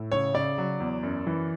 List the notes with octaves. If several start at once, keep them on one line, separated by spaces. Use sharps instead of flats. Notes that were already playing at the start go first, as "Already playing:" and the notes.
Already playing: A2
C#3 C#5
C#3 D5
F#3
E2
F#2
E3